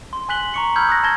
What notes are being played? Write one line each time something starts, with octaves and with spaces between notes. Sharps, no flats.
C6
G#5 C6 F#6 B6 F#7 G7
A#5 C#6 C#7
B5 E6 F6 G6 G#6
D#6 F#6 G6 A#6
A5 F#6 G#6 A#6 G7